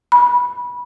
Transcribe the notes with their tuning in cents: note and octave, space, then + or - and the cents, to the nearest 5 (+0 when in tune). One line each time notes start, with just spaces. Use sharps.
B5 -20